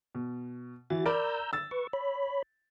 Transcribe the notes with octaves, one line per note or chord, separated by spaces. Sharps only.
B2
E3 F#4 A6
A#4 D5 A#5 B5 E6 G6
E6 A6
B4 C#6
C#5 B5